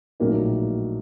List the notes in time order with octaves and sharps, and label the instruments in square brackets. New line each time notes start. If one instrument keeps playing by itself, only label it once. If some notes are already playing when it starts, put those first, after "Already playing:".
[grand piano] A#1 A2 F#3 A#3 D#4